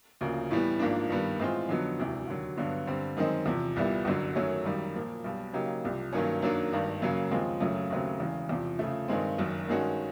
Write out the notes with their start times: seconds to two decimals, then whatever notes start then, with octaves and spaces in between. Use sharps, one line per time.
0.21 D2 C#3 F3 A#3
0.51 A2 E3 G3 B3
0.79 G#1 G#2 F3 A#3 D4
1.09 G2 D#3 G3 B3
1.39 A2 E3 G#3 C4 F4
1.69 F2 D3 F#3 B3 D#4
1.99 E1 D2 C3 E3
2.28 D#2 D3 F#3
2.57 G2 D3 F#3 B3 D4
2.87 G2 D3 G3 C4
3.17 F#2 D#3 G#3 C4 D#4
3.46 E2 C3 F3
3.76 C2 A#2 G3 B3 E4
4.05 G1 F#2 D3 F#3
4.35 F#2 D#3 F#3 A3 C#4
4.65 G#1 F#2 D#3 G3
4.95 A#2 F3 A#3
5.24 B1 B2 G3
5.53 C#3 F#3 A#3 D#4 G4
5.83 C2 C3 F3
6.12 G2 D#3 F#3 A#3 C#4
6.42 F#2 D#3 F#3 A#3 D4
6.72 G#1 G2 D#3
7.02 F#2 C#3 F#3 A#3
7.31 D#2 C#3 F3 G#3 C4
7.60 G#1 F#2 C#3 F#3 A3
7.90 D#2 C#3 F#3 A3 C4
8.20 E1 E2 C#3 E3
8.49 E2 C3 F3
8.79 C#3 F3 A3
9.08 G2 D#3 G#3 C4
9.38 F#1 F#2 D#3
9.68 G2 D#3 G#3 C#4 F#4